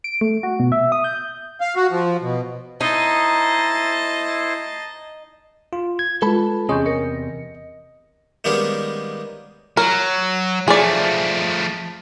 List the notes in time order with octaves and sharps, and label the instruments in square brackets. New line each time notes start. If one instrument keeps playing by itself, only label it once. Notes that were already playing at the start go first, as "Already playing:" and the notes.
[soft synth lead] D7
A3
F#4
B2
E5
D#6
G6
[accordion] F5
F#4
F3
B2
[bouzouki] D#4 [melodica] E4 C5 [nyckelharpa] D#5 A5
[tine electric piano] F4
G#6
[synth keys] G#3 F4 [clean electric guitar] A4 A5 B5 [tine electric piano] B4
[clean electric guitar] E2 C3 [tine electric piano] C#4 G#4 D#5 [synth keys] C6 C#6 G6
[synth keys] A#4 A#6 C#7 [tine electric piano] D#5
[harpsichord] D#3 G3 G#3 A#3 B3 C#4
[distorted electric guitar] F#3 [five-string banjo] A#4
[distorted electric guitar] F3 A3 [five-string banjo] G#4 D5